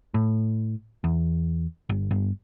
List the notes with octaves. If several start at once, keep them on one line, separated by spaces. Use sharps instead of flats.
A2
E2
G1
G1